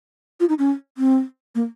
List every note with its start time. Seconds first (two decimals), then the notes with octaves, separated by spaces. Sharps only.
0.40 F4
0.49 D#4
0.59 C#4
0.98 C4
1.55 A#3